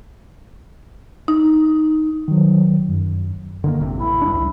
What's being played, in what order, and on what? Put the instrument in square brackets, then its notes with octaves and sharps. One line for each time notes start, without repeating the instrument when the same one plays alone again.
[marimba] D#4
[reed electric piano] D#3 F#3
F#2
[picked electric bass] D3 D#3 A#3
G#1 F2 C3
[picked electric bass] A1 [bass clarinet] E4
[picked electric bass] G2 D4
[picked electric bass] C#2 [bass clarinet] E4